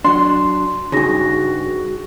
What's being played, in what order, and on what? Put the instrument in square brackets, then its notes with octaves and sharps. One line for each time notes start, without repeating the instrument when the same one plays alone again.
[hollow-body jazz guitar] F#3 D4 [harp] C6
[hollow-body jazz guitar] G2 C#3 [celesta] D#4 G#4 A#6 [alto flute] F#4